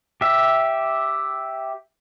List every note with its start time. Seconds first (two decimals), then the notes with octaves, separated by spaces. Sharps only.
0.21 G4 E5